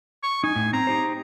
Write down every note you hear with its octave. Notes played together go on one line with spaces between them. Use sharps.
C#6
D#4 G#5
A2
C4 A#5
D#4 G4 C5